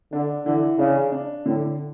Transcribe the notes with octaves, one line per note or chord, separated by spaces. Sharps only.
D3 D4
D3 E3
C#3 D4
D4
A2 D3